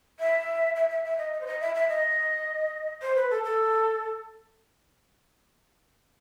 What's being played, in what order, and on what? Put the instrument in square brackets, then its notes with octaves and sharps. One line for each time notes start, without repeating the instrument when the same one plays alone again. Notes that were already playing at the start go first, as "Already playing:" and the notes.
[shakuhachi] E5
E5
E5
E5
D#5
D#5
C5
D#5
E5
E5
D#5
C5
B4
A4
A4